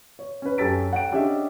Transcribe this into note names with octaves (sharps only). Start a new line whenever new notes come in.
C#5
C#4 B4
F#2 G4 A4 A6 B6 D7
F#5 G5 D7
C#4 D4 G4 G#4 D#5 E5